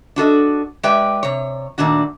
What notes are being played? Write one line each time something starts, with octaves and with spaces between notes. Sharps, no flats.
D4 F#4 A4 D#5
G#3 G4 B4 D5 E5 G5
C3 C#5
A#2 D#3 A3 D4 F#4